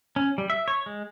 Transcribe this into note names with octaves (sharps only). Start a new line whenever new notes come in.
C#4
G3
E5
C#5
G#3